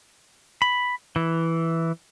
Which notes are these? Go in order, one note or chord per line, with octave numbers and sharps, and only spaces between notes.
B5
E3